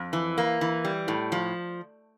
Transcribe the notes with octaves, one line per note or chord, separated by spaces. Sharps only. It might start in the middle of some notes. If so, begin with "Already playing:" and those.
Already playing: F2
E3
A#3
E3
G3
A2
F3